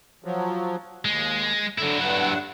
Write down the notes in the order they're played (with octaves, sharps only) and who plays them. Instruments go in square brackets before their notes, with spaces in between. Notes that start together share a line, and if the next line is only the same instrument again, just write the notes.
[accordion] F3 F#3
[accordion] D#2 [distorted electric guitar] G#3
[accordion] D3 [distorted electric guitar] F#3 E4
[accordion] G2 F#5